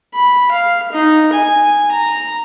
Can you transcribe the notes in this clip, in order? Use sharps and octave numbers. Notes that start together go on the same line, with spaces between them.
B5
F5
D#4
G#5
A#5